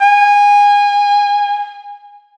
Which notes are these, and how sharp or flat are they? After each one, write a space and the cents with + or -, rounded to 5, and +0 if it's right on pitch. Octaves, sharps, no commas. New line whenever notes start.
G#5 -25